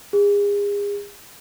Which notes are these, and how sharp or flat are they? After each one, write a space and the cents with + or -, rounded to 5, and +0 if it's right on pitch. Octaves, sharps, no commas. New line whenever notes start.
G#4 -35